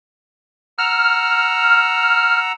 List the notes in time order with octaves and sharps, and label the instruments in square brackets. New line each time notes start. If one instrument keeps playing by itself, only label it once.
[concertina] F#5 A#5 E6 [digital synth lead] F6